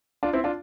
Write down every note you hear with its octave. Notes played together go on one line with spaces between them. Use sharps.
D4 F4
C4 E4
D4 F4